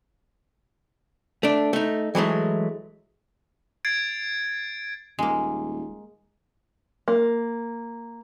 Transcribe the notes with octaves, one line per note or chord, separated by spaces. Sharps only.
A3 D4
A3 D#4
E3 F#3 G#3 A3
G#6 A6 C7 D7
D#1 G#3 A#3
A#3